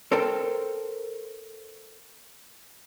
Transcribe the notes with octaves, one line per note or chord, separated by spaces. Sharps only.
A4 A#4 C5 G5 A5